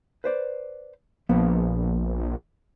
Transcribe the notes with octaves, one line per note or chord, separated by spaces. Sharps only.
B4 C5 D5
A#1 F3 A#3 B3